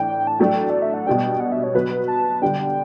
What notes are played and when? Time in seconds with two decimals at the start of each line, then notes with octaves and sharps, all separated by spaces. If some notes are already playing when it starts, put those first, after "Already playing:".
Already playing: A2 E3 D4 G5
0.27 A5
0.40 F#3 A3 D4 A4 G5
0.70 D5
0.82 E5
0.94 F#5
1.07 B2 G3 D4 G5
1.40 F#5
1.52 E5
1.64 C#5
1.74 F#3 B3 F#4 B4
2.08 A5
2.42 D3 G3 D4 G5